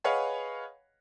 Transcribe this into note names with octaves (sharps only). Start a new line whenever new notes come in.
G#4 B4 C#5 D#5 F5 F#5